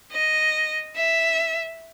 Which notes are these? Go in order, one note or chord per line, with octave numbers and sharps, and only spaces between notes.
D#5
E5